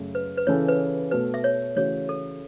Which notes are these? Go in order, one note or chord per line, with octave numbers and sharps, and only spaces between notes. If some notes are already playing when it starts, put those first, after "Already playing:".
Already playing: F#2 C#3 A3
B4
B4
C#3 E3 C#4 A4 C#5
B4
B2 A3 F#4 A4 B4
E5
C#5
C#3 E3 A3 F#4 C#5
A4